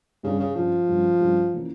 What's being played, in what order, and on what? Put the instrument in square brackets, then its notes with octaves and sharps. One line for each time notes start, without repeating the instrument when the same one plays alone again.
[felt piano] G2 G3 C#4 [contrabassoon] C#3
[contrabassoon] C#3
[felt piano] G2 G3 C#4 [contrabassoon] F3
[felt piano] G2 G3 C#4
G2 G3 C#4
E3 A#3 C#4